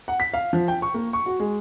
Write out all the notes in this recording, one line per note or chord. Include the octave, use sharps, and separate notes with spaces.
F#5
B6
F5
F3
G5
C#6
A#3
C#6
F#4
G#3